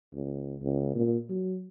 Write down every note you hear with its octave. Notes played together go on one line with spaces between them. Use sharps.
C#2
C#2
A#2
F#3